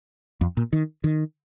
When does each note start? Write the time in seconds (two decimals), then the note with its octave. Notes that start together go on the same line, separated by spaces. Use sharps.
0.41 F2
0.57 A#2
0.73 D#3
1.04 D#3